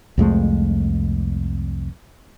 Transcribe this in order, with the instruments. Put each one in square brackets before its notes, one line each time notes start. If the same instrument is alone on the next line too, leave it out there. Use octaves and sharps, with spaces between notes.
[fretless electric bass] C2 F2 G#3 A3